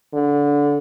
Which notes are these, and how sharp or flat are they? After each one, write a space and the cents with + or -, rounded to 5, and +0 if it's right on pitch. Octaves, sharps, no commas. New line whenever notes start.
D3 -20